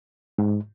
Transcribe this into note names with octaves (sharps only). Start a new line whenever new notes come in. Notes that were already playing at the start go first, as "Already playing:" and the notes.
G#2